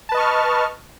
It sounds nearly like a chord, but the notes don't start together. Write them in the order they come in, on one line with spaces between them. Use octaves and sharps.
A5 B4 D#5 C#6 F6